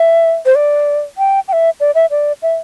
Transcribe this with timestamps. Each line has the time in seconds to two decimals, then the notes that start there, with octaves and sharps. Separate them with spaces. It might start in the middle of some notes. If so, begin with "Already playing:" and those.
Already playing: E5
0.46 C5
0.55 D5
1.18 G5
1.48 G5
1.53 E5
1.80 D5
1.95 E5
2.11 D5
2.43 E5